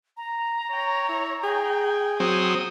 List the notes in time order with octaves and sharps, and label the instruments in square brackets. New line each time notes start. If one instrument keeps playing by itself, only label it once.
[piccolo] A#5
[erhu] C#5 [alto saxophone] G5
[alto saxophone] E4
[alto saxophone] G#4 [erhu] G5
[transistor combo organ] F#3 C4 [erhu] D#6